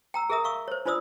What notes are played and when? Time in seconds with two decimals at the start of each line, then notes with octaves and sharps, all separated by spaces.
0.14 G5 A#5 E6
0.30 G#4 A#4 E5 A#5 D#6
0.44 F5 C#6 E6
0.68 C5 C#5
0.85 D4 F4 C5 D5 D#6 E6